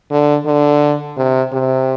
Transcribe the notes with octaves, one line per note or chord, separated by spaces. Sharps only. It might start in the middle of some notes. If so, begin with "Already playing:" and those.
D3
D3
C3
C3